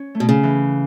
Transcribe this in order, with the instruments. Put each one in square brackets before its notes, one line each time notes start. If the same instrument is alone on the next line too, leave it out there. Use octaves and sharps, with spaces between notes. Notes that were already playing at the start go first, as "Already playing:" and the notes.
Already playing: [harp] C#4
A3
[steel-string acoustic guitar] B2
C#3
[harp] E3